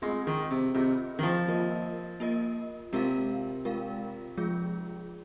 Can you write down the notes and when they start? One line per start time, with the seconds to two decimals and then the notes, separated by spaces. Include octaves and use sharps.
0.02 G#3 C4 F4 G#4 D#5
0.27 D#3
0.51 C3
0.74 C3 C4 F4 G#4 D#5
1.19 D#3
1.23 F3
1.48 A#3 F4 A#4 D#5
2.20 A#3 F4 A#4 D#5
2.93 C3 G#3 F4 A#4 F5
3.65 G#3 F4 A#4 F5
4.37 F3 G#3 F4 G#4